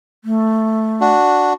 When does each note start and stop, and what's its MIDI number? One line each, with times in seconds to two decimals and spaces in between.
0.25 1.10 57
1.01 1.53 62
1.01 1.53 66